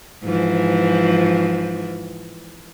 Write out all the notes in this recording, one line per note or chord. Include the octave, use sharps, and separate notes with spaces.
G#2 E3 F3